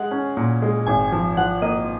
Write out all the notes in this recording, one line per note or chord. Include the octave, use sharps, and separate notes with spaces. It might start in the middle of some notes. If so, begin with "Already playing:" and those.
Already playing: G#3 F#5
C#4
A#2
G#3
G#1 G#5
F3
F3 F#5
A#3 D#5